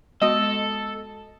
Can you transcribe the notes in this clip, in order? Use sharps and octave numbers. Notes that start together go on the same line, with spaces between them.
G#3 B3 F#4 A4 D#5